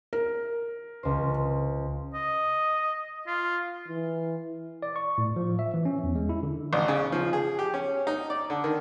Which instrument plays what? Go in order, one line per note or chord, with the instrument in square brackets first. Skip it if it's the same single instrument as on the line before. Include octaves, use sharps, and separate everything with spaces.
[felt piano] A#4
[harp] C#2 C5
[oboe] D#5
F4
[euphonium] E3
[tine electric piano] D5
C#6
A2
F3
E5
E3
C#4
E2
G#3
E4
D3
[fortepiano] A1
C#3
F3
G#4
G4
C#4
D#4
D5
D3
D#3